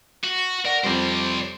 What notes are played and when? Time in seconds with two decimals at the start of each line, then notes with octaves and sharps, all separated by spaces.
0.24 F#4
0.65 A#4 D5 F#5
0.84 F2 G3 C5 D5